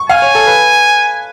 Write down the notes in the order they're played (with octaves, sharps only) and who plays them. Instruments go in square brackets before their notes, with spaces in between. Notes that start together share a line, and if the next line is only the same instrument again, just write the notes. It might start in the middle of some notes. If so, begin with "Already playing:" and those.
Already playing: [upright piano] C#6
[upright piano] F5 [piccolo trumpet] G#5
[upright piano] C#5
A4
B4